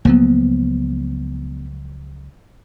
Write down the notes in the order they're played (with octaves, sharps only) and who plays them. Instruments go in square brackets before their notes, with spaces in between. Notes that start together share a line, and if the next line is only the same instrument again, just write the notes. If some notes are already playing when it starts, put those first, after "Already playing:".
[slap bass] C#2 F3 F#3 [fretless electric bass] A#3 B3